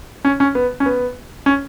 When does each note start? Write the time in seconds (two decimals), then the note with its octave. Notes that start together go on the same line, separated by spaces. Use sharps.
0.25 C#4
0.40 C#4
0.55 B3
0.80 C#4
0.86 B3
1.46 C#4